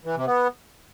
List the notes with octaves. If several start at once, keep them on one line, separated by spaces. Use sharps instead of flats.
E3
C3
B3